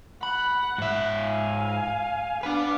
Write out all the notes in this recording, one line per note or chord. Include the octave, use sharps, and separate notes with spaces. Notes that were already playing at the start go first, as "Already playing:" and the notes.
F#5 B5
G#2 E5
F5 G#5
B3 D4 B4 F5